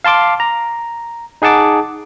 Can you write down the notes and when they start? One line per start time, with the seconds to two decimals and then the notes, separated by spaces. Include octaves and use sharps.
0.04 F5 A5 C6 D6
0.40 A#5
1.42 D#4 G#4 F#5 A5 D6